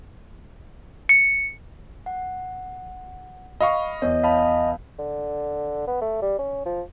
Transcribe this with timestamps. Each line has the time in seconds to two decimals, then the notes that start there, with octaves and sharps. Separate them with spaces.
1.09 C#7
2.06 F#5
3.61 D#5 F5 B5 C#6
4.02 E2 C#5 D#5
4.23 F5 A5 B5
4.99 D3
5.88 B3
6.01 A3
6.22 G3
6.39 C#4
6.66 F3